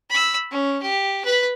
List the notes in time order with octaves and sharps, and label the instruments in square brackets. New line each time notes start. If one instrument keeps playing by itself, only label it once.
[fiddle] B5 E6
C#4
G4
B4 B5